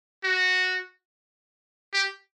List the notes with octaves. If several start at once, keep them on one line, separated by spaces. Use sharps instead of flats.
F#4
G4